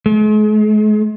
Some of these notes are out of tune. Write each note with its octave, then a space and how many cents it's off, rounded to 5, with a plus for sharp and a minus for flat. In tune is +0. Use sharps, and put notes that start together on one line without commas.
G#3 +45